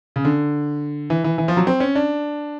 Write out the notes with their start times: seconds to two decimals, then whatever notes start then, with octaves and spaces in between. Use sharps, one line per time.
0.16 C#3
0.25 D3
1.10 E3
1.24 E3
1.38 E3
1.48 F3
1.57 F#3
1.67 C4
1.80 C#4
1.95 D4